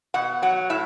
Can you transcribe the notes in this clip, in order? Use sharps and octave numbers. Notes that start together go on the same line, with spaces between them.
B2 F#5
F#3 F#5
A2 E5